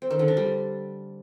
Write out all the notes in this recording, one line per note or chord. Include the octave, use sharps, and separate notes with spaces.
C4
D#3
D3
D4
G3